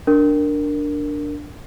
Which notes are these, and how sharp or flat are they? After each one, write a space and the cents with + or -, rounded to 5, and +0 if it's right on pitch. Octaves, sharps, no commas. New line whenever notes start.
D4 +0 A#4 -5